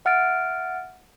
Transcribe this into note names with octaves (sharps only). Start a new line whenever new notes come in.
E5 F#5 F6 A6 D7